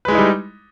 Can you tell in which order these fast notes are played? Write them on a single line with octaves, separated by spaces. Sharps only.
B4 G#3 E4 D#4 G3